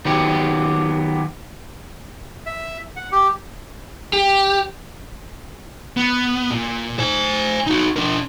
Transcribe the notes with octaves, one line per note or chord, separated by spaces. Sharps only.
D#3 F#3 B3 G4
E5
F#5
G4
G4
B3
A#2
C5 G#5
D#4 F#4
D4 A#4